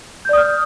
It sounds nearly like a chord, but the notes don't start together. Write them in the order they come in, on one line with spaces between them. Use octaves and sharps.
G6 D5 D#6 F6